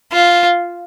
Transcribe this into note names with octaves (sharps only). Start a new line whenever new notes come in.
F4